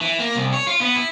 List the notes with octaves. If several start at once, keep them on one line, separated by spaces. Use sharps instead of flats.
E3
A#3
C2
C#5
F4
B3
E4